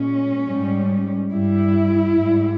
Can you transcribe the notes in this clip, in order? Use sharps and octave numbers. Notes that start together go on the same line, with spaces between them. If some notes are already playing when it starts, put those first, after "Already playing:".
Already playing: A#2 G#3 C#4
G#2 G3
G2 G3 E4
G#2 G3